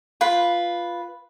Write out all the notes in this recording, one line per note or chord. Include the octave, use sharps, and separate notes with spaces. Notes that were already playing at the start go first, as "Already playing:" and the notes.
F4 B4